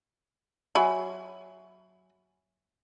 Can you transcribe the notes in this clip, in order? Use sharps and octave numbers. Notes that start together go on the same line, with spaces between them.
F#3 E5 G#5 B5